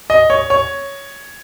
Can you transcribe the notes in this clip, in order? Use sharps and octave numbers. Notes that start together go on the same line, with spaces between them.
D#5
C#5
C#5